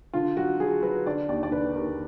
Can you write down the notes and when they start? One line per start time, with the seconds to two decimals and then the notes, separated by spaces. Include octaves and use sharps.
0.13 D3 F4
0.37 F#3 F#4
0.60 F#3 G#4
0.82 F#3 B4
1.06 D3 D5
1.29 D#2 D5
1.43 D5
1.51 D3 B4
1.75 D#2 A#4